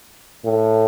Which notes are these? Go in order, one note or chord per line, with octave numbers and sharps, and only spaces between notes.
A2